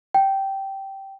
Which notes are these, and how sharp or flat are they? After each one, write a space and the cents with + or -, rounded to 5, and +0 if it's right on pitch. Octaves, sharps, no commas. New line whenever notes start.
G5 -10